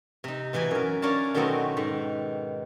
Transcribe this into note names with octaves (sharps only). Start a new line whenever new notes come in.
C3 D#4
B2 E3 B4 G#5
F#2 A#4
C#4 D4 A#4 C#5 F5 A5
B2 D#3 F#3 A3 B3 C4
G#2 D#3